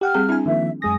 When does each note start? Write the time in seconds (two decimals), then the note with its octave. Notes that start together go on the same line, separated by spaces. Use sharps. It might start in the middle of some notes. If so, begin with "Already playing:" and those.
0.01 G4 F#5 G5 F6
0.14 G3 C4 G#4
0.29 C4 D4 E4 G#5
0.46 D#3 F3 A#3 E5
0.82 F#2 G#3 G#5 D#6 A#6